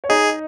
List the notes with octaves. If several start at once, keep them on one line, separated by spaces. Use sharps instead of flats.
C#5
D#4 G#4 D#5